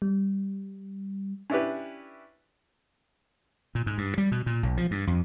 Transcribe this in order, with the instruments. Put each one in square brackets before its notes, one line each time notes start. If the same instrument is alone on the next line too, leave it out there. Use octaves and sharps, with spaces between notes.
[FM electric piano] G3
[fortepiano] C#4 D4 E4 G4 B4
[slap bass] A#2
G#2
G2
G3
B2
A#2
B1
F3
G2
F2